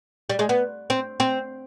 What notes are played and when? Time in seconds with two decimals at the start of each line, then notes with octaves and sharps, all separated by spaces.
0.30 G3
0.39 G#3
0.49 B3
0.90 C4
1.20 C4